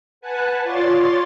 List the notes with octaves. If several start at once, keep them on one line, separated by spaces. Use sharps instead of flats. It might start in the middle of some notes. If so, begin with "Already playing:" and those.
B4 F#5 G#5 A5 F#6
F4 C#5 D5 C6 A6